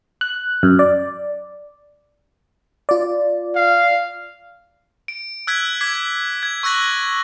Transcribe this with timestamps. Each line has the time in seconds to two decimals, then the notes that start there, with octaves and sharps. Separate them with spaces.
0.21 F#6
0.63 F#2
0.79 D5
2.89 F4 D5
3.56 F5
5.08 D7
5.47 E6 F#6 G#6 B6
5.81 D6 G#6 B6
6.43 G#6
6.63 C#6 E6 F#6 A#6 F#7